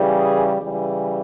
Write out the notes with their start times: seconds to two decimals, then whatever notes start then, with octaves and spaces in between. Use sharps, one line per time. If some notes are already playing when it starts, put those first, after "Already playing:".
Already playing: C#3 E3 G3
0.18 G#4
0.61 C#3 E3 G3